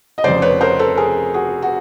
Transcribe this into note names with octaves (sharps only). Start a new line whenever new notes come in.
D#5
F1 F2 C#3 C5 D5
B4 C#5
A#4 C5
A4 B4
G#4 A#4
F#4 G#4
F#4